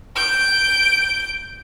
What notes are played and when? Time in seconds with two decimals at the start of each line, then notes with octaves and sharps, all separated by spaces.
0.15 G6 D7